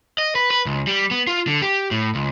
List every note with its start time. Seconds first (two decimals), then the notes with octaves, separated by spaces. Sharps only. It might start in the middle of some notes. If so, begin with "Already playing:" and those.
0.18 D#5
0.35 B4
0.51 B4
0.66 C#2
0.87 G3
1.11 B3
1.27 F4
1.47 D3
1.62 G4
1.91 A2
2.15 C#2